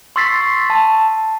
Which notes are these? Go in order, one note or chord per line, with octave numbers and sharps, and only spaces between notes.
C6 C#6 E6 A6 B6 C7
A5